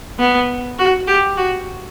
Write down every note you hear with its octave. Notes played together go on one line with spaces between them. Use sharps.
B3
F#4
G4
F#4